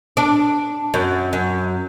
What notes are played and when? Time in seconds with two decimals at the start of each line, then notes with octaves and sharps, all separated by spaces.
0.17 D4
0.94 F#2
1.33 F#2